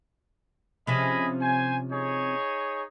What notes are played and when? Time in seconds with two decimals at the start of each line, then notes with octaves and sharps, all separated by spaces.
0.87 C3 F3 C#4 G#4 D#5 B5
1.41 C5 G#5
1.91 D#4 G#4 C#5